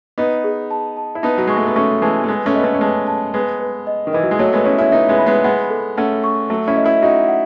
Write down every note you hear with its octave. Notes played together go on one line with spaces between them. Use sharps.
B3 D#4 D#5
G#4
A5
A5
E4
B3 D#4 A5
F#3
G#3 C#6
A3
B3
A3 C#4 C#6
E3 G#3 A5
A3
G#3 B3 B4
A3 C#4
B3 D#5
A3 C#4
C#4
G#3 B3 A5
A5
G#3 B3 B4
B4
D#5
D#3
E3 D#5
F#3
G#3
F#3 A3 C#5
G#3 B3
C#4 E4 C#5
C#4 E4
B3 D#4 E5
G#3 B3
B5
G#3 B3
G#3 B3 F#5
A4
A3 C#4 F#5
C#6
F#3 A3 F#4
C#4 E4
D#5
C#4 E4
D#4 F#4 D#5
F#5